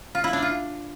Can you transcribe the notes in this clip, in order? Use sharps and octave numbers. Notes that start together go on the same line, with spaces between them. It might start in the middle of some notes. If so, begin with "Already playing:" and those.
F4
E4
D4
F4